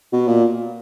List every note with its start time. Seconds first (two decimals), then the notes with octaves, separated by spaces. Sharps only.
0.13 B2
0.28 A#2